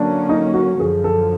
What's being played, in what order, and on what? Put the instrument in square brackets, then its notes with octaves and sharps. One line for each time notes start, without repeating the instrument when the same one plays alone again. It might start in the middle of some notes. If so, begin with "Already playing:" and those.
Already playing: [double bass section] D3 F#3 A#3 C#4 [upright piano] D4
[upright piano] D#4
F#4
[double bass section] F#2 D3 F3 [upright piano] G#4
[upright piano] A4